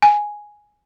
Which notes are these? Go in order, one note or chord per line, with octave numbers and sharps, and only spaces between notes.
G#5